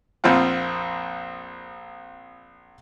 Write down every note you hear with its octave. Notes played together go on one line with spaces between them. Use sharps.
A#1 F2 C4 F4 F#5